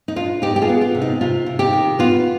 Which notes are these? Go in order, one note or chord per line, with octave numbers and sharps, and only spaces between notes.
D#4
D4 F4
B3 D#4 G4
G4
F4 G#4
B3
F4
C3
D#4
C3 F4
C3
D#4 G4
D#3
B3 F4